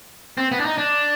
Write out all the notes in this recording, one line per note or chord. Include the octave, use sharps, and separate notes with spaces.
C4
B3
D4
D#4
D4